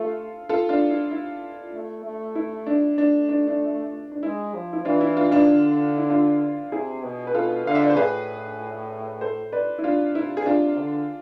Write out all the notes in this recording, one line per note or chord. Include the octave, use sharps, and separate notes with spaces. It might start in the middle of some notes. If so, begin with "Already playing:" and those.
Already playing: A3 F4 A4
F4 A4
D4 F4
E4
E4
A3
A3
E4
D4
A3 D4
D4
D4
D4
G#3 E4
F3
E4
E3 D4 F4
E4
D4 F4
D4 F4
D3
E4
D4 F4
C3 E4 G#4
B2
B4
B2 F4 A4
D3 F5
E5
D5
C5
A2 G#4 B4
A4 C5
B4 D5
E4
C3 D4 F4
C3 E4
G#4
C3 D4 F4
D3